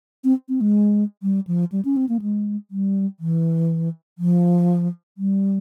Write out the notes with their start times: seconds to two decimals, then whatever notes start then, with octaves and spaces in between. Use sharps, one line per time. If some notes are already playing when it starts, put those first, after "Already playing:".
0.24 C4
0.49 C4
0.61 G#3
1.23 G3
1.47 F3
1.72 G3
1.85 C#4
1.97 C4
2.09 A#3
2.21 G#3
2.71 G3
3.20 E3
4.18 F3
5.18 G3